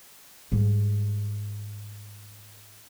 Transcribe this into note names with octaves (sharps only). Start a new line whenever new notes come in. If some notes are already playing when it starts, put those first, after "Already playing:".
G#2 G3